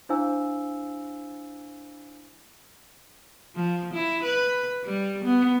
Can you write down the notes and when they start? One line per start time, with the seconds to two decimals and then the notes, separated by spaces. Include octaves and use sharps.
0.09 D4 E4 C5 F5 G#5 E6
3.56 F3
3.94 E4
4.23 B4
4.85 G3
5.25 B3